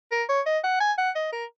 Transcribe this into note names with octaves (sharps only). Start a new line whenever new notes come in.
A#4
C#5
D#5
F#5
G#5
F#5
D#5
A#4